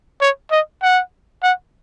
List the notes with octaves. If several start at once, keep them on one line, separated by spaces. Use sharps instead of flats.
C#5
D#5
F#5
F#5